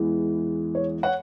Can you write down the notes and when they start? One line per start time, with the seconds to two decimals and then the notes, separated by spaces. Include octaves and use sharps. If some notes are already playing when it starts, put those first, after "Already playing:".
Already playing: E2 E3 G#3
0.75 C#5
1.03 C#5 F#5